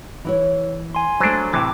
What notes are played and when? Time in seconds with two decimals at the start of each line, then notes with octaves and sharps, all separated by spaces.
0.25 E3 E4 C#5
0.95 G#5 C6
1.20 F#3 A3 D4 C5
1.53 A2 C3 E3 D6